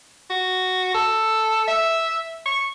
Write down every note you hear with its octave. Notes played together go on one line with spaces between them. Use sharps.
F#4
A4
E5
C#6